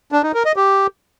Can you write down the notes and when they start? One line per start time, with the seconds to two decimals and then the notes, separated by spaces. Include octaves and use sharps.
0.12 D4
0.23 D#4
0.34 A#4
0.45 D#5
0.56 G4